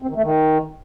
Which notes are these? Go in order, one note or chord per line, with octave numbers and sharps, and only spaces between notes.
C4
D#3
A3
D#3